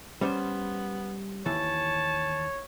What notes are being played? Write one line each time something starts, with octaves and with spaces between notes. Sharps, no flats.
G3 B3 C#4 C5
D#2 E3 C#5 A5